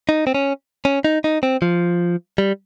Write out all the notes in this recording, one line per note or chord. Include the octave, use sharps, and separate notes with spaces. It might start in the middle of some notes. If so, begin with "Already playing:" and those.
D#4
C4
C#4
C#4
D#4
D#4
C4
F3
G3